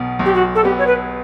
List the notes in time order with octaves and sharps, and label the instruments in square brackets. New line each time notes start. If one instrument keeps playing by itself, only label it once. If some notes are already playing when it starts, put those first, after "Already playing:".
Already playing: [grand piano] B1 B2
B1
[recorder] G4
F#4
A4
[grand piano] B3 [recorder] G4
[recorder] C#5
B4